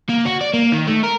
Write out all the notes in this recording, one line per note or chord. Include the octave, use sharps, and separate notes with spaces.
A#3
F#4
D5
A#3
D#3
A3
A#4